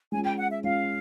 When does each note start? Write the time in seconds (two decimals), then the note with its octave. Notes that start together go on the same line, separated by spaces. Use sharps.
0.12 G#3 C#4 F4 G#5
0.24 G5
0.37 F#5
0.50 E5
0.64 G#3 C#4 F4 F5